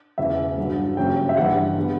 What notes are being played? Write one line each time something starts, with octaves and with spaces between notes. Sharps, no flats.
E1 E2 C#3 E3 E5
G1 G2 D3 F#3
F#1 F#2 C#3 G3 G5
E5
G1 G2 E3 G3 F#5
D3 G3 B3